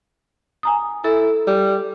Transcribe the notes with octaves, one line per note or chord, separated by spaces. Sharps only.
G#5 A#5 D#6
E4 A4
G3